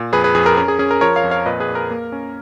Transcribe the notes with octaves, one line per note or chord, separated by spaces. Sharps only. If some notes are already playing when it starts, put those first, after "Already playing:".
Already playing: A#2
F2 G#4 B4
G#4 B4
F2 G#4
A#4
C#4 A#4
G#4
C#4 G#4
A#4
F3 A#4 C#5
C#5 F5
F2
C#5 F5
A#2 B4 D#5
G#4 B4
A#2
A#4
A#3
C#4